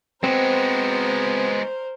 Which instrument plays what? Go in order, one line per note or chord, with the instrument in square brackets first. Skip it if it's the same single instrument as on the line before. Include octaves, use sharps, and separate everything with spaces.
[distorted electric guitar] G#3 F#4 [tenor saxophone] B3 [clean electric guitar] C4 [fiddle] A#4 C5